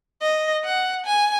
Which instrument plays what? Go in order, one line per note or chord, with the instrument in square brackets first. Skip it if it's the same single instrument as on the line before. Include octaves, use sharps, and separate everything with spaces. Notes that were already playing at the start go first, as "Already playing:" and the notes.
[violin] D#5
F#5
G#5